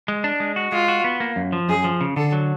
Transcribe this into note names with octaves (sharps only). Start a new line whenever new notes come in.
G#3
D4
G#3
F#4
G#3 F4
F#4
B3
A#3
F#2
F3
F#2 G#4
F3
C#3
D3 A4
F#3